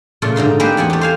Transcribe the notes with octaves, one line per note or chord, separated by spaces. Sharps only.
A#2 C#3 A3 F4
G#2 D3 D#4 C6
G#3 A#3 C4 G4 B4 C5
E2 A#3 F#5 G#5
A3 G4
C5 F5 G#5